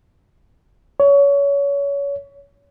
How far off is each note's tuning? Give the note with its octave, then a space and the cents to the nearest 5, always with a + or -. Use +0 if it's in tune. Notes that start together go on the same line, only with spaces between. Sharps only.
C#5 +25